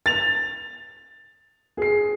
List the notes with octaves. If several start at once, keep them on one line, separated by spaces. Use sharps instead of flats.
A6 F7
G#4 C7